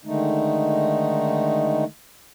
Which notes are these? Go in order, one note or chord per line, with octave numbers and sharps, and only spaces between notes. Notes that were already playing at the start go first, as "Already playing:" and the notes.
D3 D#3 G#3 A3 D#4